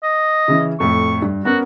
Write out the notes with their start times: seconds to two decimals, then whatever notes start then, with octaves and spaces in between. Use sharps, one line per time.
0.03 D#5
0.48 C#3 E3 C#4
0.80 F2 A2 C#6
1.22 G2
1.45 B3 C#4 F#4 A#4